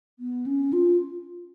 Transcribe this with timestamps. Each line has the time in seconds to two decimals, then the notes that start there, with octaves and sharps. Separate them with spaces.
0.19 B3
0.46 C#4
0.73 F4